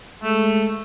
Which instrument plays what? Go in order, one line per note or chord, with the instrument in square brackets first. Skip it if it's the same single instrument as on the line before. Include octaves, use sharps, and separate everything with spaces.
[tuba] G#3 [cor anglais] A3